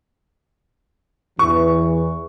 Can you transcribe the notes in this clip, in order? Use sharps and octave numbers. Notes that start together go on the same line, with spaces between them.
E2 E3 C#6